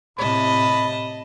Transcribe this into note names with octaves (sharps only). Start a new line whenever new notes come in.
A2 C3 D#5 A5 B5